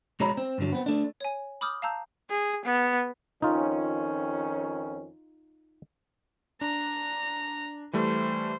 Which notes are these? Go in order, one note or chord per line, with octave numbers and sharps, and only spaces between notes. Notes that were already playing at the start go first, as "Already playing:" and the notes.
B1 G#3 F#4 C#5 A#5 B5
C4
G2 D3 F#3
B3 C4
A3 D4
C#5 G#5
B5 D6 D#6 F6 G6
F5 A5 A#5 E6 G6
G#4
B3
F2 D#3 C#4 D#4 F4
D4 A#5
E3 G3 A3 C5